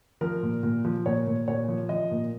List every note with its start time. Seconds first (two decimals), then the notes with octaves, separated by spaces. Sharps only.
0.21 F3 A#4
0.43 A#2
0.63 A#2
0.85 F3
1.06 A#2 C#5
1.27 A#2
1.48 A#2 C#5
1.68 F3
1.89 F3 D#5
2.11 A#2